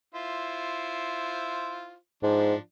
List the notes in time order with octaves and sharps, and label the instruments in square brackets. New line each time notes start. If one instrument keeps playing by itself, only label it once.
[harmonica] E4 F4 C5
[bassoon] G#2 [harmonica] F3 D4